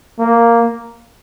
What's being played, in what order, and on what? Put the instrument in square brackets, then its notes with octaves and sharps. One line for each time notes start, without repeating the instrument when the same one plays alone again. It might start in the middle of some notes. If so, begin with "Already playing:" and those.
[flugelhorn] A#3